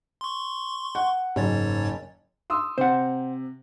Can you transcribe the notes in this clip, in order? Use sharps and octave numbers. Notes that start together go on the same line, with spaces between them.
C6 C#6
F#5
F#1 G#2 C#5 A6
C6 D#6 E6
C3 C5 F#5